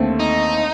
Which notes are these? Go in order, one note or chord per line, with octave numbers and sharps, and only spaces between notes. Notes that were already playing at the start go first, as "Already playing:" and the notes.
Already playing: D#2 D3 A3 C4
D#4